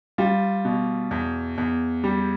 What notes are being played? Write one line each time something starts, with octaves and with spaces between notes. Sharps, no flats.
G3 F4
B2
E2
E2
G3